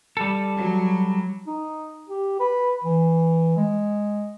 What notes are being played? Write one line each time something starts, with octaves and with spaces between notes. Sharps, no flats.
G3 A4
F#3
D#4
G4
B4
E3
G#3